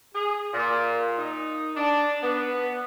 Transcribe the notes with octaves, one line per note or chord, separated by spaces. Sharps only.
G#4
A#2
D#4
D4
B3